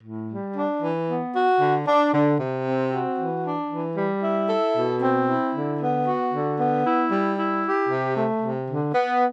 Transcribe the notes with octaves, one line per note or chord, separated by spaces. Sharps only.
A2
G3
D4
E3
B3
F#4
D3
D4
D3
C3
C4
F#4
E3
D4
E3
G3
E4
A4
B2
C4
E4
D3
B3
F#4
D3
B3
E4
G3
E4
G4
C3
A3
C3
D3
B3